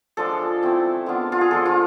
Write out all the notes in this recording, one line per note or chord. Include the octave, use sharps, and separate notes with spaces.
F3 G#3 D4 F4 A4
A3 C4 E4
G#3 B3 D4 F4
F4
G#4
F3 G#3 D4 A4
F4